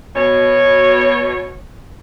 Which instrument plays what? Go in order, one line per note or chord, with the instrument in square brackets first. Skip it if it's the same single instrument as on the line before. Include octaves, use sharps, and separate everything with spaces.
[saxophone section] B2 C#5